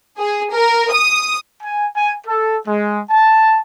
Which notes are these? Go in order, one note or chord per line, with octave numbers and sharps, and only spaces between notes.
G#4
A#4
D#6
G#5
G#5
A4
G#3
A5